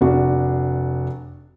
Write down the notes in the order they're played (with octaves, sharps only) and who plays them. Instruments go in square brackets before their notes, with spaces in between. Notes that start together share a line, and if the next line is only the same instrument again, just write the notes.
[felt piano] F1 D4 F#4